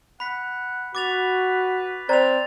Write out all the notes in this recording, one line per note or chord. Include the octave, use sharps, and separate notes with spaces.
F#5 B5 B6
F#4 B4 D6 A6 F7
C4 C5 D5 A#5 A6 F7